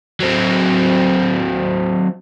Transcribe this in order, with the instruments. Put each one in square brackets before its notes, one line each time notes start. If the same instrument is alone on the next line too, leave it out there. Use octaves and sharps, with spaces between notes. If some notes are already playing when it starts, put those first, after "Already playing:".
[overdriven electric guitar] F#3 C4